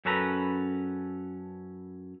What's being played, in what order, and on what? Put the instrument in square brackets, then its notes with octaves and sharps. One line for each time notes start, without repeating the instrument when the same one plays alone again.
[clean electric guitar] F#2 C#4 A4 B4 A#5